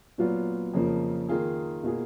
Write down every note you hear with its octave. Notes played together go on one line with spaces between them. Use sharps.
A#2 F#3 B3 F4
F2 C#3 F3 A#3
D#3 A#3 F4 G#4
B2 A#3 F4 G#4